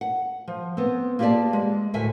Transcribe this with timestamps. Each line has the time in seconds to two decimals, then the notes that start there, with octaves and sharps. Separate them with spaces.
0.01 F#5
0.48 F3
0.77 B3 C4
1.19 A#3 F4 G4 G#4 D5 A5
1.53 G#3
1.94 D2 A2 E5 G#5